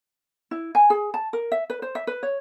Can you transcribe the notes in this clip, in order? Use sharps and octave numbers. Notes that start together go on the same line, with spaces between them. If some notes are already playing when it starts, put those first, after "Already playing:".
E4
G#5
G#4
A5
A#4
E5
B4
C5
E5
B4
C#5